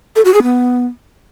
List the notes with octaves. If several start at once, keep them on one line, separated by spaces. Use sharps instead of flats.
A4
F#4
G#4
B3